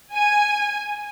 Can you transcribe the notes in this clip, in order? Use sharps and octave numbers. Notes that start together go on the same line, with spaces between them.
G#5